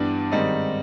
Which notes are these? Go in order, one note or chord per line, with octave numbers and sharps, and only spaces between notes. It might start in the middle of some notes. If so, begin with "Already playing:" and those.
Already playing: G2 E3 G3 B3 D4
G#2 D#3 G3 C4 D#4